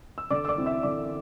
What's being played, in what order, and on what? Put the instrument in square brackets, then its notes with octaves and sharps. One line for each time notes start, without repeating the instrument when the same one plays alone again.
[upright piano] E6
D3 D5 D6
E6
D5 D6
C4 E4
E5 E6
D3 D5 D6